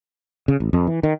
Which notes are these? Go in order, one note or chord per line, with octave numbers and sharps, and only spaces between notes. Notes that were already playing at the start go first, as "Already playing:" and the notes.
C#3
A1
F2
E3
D#3